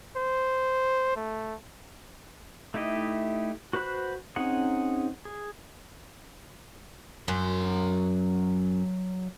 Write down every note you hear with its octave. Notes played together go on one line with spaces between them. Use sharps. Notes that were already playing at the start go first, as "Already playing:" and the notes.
C5
A3
A3 D#4 E4 G4 D#5
F#4 B4 C5 B5 F#6
C4 C#4 D#4 G#4 F#5
G#4
F#2 F#3 C6